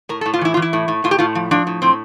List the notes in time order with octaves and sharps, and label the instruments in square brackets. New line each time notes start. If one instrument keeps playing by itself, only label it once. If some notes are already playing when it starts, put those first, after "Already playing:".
[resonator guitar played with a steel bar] A2 A#4
A4
A2
F4
E3 E4
F4
E3
E4
A2
A2
A2 F4
G4
A2 F4
F3
F3 D4
A2
A2 C4